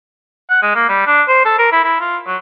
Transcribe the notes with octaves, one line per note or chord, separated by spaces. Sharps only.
F#5
G#3
A#3
G3
D4
C5
A4
A#4
E4
E4
F4
F#3